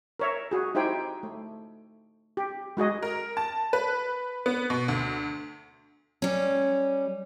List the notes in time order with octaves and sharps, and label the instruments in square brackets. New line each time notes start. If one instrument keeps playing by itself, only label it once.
[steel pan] A#4 C#5 E5
F#4 G#4
D#4 E4 G4 C5 G5 G#5
A3
G4
G#3 F#4 G#4 D#5
[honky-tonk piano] A#4
A5
B4
B3
B2
D2
[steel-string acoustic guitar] G3 C#4